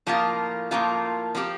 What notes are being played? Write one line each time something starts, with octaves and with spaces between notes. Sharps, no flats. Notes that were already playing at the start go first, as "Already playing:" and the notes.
A2 F3 A#3 F4 A#4
A2 F3 A#3 F4 A#4
F3 C4 G4